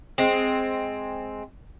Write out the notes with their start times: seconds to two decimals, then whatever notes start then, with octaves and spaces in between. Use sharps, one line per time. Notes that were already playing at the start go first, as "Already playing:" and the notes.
0.18 G#3 C4